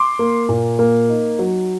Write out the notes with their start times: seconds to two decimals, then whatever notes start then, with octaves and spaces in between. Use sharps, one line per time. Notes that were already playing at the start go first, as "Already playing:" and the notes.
Already playing: C6 D6
0.19 A#3
0.49 A#2
0.79 A#3
1.09 D#4
1.39 F#3